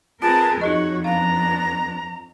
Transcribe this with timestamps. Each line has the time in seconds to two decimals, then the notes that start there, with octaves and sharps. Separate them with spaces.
0.22 C4 F4 G#4 A#4 B4 A5
0.61 F2 D#4 F#4 G#4 C#5 D#5 C#6
1.04 B3 D4 F5 A#5